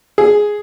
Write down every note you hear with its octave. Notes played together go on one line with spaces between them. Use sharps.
G#4